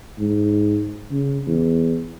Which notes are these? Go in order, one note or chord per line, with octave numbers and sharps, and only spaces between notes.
G#2
C#3
E2